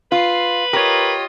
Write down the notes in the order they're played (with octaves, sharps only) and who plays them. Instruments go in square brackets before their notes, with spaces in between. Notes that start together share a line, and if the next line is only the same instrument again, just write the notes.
[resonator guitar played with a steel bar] F4 [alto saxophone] B4 [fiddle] F5
[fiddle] F4 D#5 [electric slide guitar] G4 C#5 [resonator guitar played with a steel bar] A#4